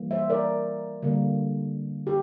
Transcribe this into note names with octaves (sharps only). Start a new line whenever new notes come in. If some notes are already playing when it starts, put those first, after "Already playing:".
Already playing: E3 G3 A#3
C5 E5
A#4 D5
D3 G3 A#3
G4